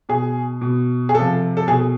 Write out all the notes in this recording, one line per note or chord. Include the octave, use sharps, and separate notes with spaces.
B2 G#4
B2
G#4
C3 F3 A4
A4
B2 G#4